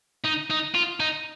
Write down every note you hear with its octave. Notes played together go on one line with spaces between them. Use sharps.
D#4
D#4
F4
D#4